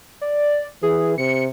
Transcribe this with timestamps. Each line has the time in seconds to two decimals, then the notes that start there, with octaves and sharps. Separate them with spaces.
0.21 D5
0.83 E3 G#4
1.18 C3 C#7